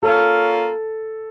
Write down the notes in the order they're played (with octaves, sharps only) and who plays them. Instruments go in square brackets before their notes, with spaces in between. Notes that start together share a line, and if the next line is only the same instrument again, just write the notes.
[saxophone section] A#3 C#4 F4 [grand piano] A4